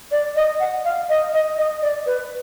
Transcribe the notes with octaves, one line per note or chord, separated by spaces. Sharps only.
D5
D#5
F#5
F5
D#5
D#5
D#5
D5
B4